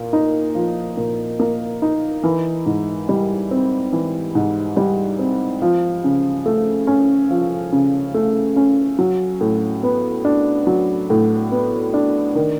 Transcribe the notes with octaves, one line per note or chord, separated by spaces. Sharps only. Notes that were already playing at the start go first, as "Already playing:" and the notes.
Already playing: A#2 A#3
D#4
F3
A#2
A#3
D#4
E3
G#2
G3
C4
E3
G#2
G3
C4
F3
C#3
A3
C#4
F3
C#3
A3
C#4
F#3
A2
B3
D4
F#3
A2
B3
D4
D#3